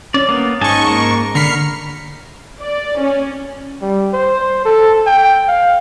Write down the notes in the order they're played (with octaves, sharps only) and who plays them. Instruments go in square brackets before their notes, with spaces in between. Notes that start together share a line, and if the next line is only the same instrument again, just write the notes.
[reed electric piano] C#4 [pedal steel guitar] D5
[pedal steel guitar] A#3 B3
[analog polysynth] G#2 C#6 [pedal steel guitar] D#5 G#5 A5
[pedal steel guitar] A#3 A#4
[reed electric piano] D3 [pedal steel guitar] A#4 B5 [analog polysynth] F6 C7 C#7
[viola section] D5
C#4
[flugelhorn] G3
C5
A4
G5
F5